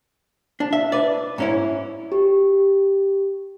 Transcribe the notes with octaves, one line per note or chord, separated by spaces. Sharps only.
D4
E5
B4 D5
G#2 C#4 E4
G4